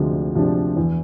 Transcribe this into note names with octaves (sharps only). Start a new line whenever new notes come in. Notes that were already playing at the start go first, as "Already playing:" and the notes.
Already playing: D2 C3 F3 G#3 D4
C3 F3 G#3 D4
E2